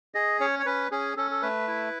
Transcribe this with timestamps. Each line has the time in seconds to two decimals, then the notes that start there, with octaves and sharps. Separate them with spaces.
0.14 G#4 D#5
0.40 C#4 C#5
0.59 C#5
0.66 C#4 B4
0.91 C#4 G#4
1.17 C#4 A4
1.31 A4
1.42 A3 B4
1.67 E4